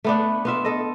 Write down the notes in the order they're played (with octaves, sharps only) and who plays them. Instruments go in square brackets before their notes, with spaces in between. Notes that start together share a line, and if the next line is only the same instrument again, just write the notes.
[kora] A3 B3 D4
B3 F4 E5
A4 D#5